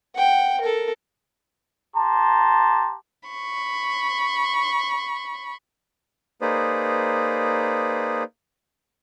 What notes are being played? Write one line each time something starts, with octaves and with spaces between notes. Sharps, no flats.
F#5 G5
A4 A#4
G4 A5 A#5 C6
B5 C#6
A#3 D#4 G#4 B4 C5 D5